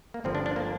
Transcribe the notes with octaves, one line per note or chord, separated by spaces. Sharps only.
A#3
G1 G2 D3 F3 C4
D4
D4
A#3